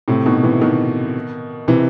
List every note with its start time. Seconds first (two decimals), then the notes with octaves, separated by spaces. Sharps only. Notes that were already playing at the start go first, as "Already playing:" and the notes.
0.08 A2 C3
0.25 B2 D#3
0.43 C3 E3
0.61 B2 D#3
1.68 C3 E3